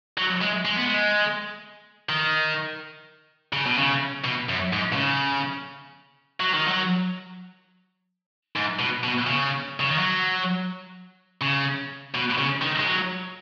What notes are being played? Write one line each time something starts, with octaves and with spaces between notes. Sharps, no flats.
F#3
G#3
G#3
B3
G#3
D#3
C#3
B2
C#3
B2
F#2
G#2
B2
C#3
F#3
D#3
F#3
G#2
B2
B2
C#3
C#3
D#3
F#3
C#3
B2
C#3
D#3
G#3
F#3